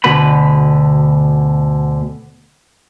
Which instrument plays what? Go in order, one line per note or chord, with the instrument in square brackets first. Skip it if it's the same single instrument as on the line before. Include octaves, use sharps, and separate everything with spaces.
[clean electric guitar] D2 B2 D3 B4 B5